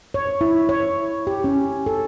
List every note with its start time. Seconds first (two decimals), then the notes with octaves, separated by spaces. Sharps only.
0.14 C#5
0.41 E4
0.69 C#5
1.27 G4
1.44 C#4
1.86 A4